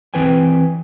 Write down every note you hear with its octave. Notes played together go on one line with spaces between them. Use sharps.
E3 C4 B4 G5 G#5